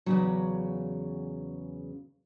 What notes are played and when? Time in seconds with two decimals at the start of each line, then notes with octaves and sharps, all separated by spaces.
0.06 E2 C#3 F#3